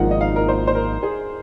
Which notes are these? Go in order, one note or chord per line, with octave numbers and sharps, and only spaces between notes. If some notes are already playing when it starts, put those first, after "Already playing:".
Already playing: G#1 G#2 F3 A#3 D#4 F#5
D#5
F5
A#4
C5
C5
A#4
G#4